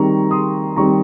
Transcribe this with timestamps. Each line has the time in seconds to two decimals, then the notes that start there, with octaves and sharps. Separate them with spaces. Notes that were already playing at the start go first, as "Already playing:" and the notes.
Already playing: D#3 G3 C4 A#5 C#6
0.31 C6 D#6
0.76 D#3 G3 C4 A#5 C#6